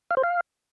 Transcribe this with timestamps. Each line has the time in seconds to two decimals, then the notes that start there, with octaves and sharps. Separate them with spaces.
0.11 F5
0.17 C5
0.23 F5